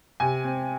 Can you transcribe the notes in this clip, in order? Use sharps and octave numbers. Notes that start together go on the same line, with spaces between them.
C3 G#5
C4